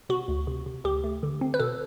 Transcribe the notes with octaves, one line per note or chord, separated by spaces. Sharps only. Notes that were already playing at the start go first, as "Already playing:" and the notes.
C3 F#4
D2
C3
C3
D2 G4
A3
D3
C4
B4
B2 A4